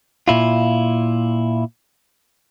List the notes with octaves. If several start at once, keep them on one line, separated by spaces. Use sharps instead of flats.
A#2 E4 F4